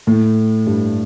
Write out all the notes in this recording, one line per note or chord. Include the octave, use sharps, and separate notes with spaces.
A2 A3
G2 G3